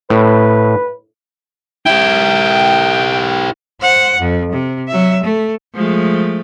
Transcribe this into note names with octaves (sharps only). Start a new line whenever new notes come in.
A2 B4
E4 G4 G5
C5 F#5
F2
C3
F#3 E5
A3
F3 G#3 A3